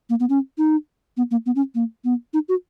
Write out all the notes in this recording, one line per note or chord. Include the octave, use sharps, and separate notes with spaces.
A#3
B3
C#4
D#4
B3
A#3
B3
C#4
A#3
B3
D#4
F#4